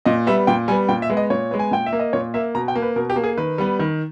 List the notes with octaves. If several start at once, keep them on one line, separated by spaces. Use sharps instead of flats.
A#2 D#5
G3 B3 E5
A#2 G5
G3 B3 G#5
A#2 G5
E5
G#3 B3
D#5
A#2 C#5
G#3 B3
G#5
A#2 G5
E5
A#3
D#5
A#2 C#5
A#3 E5
B2 A#5
G5
A#3
B4
B2 A#4
G4
A#3
G#4
D#3 B4
G3 B3
D#3